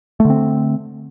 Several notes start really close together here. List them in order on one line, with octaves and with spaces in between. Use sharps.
A3 D3 C4